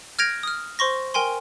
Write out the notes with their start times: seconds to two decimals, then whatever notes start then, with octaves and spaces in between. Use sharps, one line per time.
0.19 F6 G6 G#6 A#6 D7 F7
0.43 D#6 F6
0.79 C5 C6 C#6 A#6
1.14 A#4 G5 G#5 C6